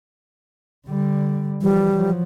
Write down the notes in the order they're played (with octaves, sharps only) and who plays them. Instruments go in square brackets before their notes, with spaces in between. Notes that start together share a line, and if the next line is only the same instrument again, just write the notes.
[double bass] D3 G3
[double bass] E3 F3 [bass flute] G3
[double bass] F3 F#3